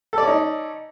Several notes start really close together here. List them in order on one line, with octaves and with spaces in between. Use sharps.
A4 D5 C#4 D#4